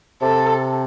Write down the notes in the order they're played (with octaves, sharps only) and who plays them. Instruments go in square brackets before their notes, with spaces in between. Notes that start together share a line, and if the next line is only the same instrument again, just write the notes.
[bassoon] C3 [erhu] A4